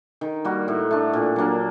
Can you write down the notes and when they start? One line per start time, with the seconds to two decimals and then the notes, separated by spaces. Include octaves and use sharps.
0.21 D#3
0.45 G3 A#3 F#4
0.68 A2
0.91 A3 D4
1.13 A#2
1.36 F#3 A#3 D4